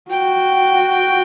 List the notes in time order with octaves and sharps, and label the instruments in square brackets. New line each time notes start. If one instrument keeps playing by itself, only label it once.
[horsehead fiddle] F#4 [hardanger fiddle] G5